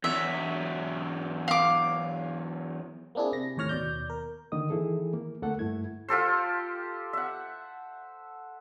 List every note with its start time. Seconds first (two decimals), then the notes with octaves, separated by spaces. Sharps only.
0.04 E2 F#3 E5
1.48 F5 D6
3.15 A#3 C4 D4 E4 G#4
3.33 C3 A#6
3.57 D#2 A2 C#5 F6 A#6
3.69 D#2 B2 D5 G6
4.10 A#4
4.52 D3 D#3 A#3 D#5 D#6
4.70 D#3 E3 E4 G#4 A4
5.14 A#3
5.42 D2 A3 A#3 A4 F#5
5.59 G2 A3 E4 G#6
6.08 F4 G4 A4 C5
7.13 E5 F#5